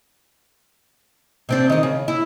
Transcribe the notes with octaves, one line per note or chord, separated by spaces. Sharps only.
C3 C4 D4
D#3 D#5
C#3
E4